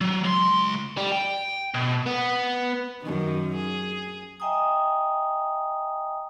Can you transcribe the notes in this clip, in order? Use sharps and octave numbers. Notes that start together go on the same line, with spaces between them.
F#3
C#2 C6
G3
G5
B2
B3
F#2 D#3
G#4
D#5 E5 G5 G#5 A#5 D#6